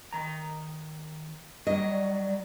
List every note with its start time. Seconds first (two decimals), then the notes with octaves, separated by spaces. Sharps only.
0.13 D#3 A#5
1.67 F#3 G3 D#5
1.91 D5